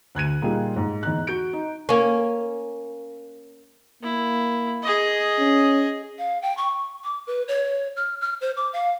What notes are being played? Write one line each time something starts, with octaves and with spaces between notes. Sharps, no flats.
D2 F#6 G#6 D#7
A#2 G3 D#4 F4 G#4
G#2
E2 D#4 F#6
F#4 G6 D7
D#4
A#3 C#4
A#3 E4
G#4 D#5
C#4
F5
G5
C#6
D6
B4
C#5
F6
F6
C5
D6
F5